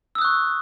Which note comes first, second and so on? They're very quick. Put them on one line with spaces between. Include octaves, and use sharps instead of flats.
E6 D#6 F#6 C#6